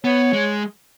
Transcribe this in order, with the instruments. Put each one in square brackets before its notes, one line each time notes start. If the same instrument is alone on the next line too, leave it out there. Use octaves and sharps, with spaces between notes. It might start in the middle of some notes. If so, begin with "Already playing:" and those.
[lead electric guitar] B3 [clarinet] C#5
[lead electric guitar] G#3